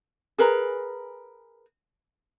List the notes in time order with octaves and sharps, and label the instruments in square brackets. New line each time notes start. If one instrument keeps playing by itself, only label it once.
[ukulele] G#4 A#4 B4 A#5